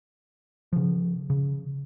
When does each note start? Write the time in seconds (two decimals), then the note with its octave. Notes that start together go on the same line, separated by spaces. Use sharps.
0.73 C#3 F3
1.30 C#3